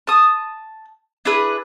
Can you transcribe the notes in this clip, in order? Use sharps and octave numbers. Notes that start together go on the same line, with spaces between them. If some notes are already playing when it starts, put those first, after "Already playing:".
A5 D#6
D4 E4 G#4 B4